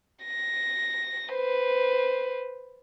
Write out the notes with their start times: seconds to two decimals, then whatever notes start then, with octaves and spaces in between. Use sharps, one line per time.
0.24 A#6
1.33 B4 C5